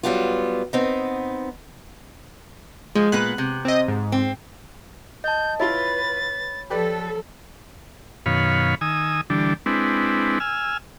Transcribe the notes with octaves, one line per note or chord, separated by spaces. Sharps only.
F#3 G3 B3 F4
B3 C4 D#4
F3 G#3
A#2 B3 B4 F#6
C3
C4 D#5
G#2
C4
D#5 A5 G6
E4 F4 B4 C#5 B5 A6
F3 G4 A4 B4 D5
F#2 B2 D#3 C#5 F5 B5
D#3 G#5 D#6 E6
D3 E3 G3 D4
G#3 C4 D4 E4 B4
G#5 E6 F6